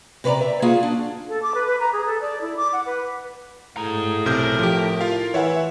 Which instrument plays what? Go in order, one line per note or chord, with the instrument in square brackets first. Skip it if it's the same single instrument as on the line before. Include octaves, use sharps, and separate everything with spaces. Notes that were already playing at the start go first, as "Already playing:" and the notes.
[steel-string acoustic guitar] C3 B4 C#5 D5 A#5
E5
A#3 F4 F#4 G#4
D4
[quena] A4
D6
B4
B4
A#5
G#4
A4
D5
E4
D6
F#5
B4
[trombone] A2 [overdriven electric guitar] G#4 A#5
[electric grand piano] B1 C3 G6 [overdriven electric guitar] A#4
[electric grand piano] F3 G4
F4 F5
[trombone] E3 [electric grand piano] C#5 E5 F#5